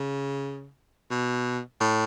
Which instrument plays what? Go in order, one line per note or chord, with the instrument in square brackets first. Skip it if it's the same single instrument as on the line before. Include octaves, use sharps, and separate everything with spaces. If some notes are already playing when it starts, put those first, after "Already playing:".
Already playing: [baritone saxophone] C#3
B2
A2